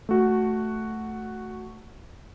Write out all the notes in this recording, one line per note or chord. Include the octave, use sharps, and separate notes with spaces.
A3 F#4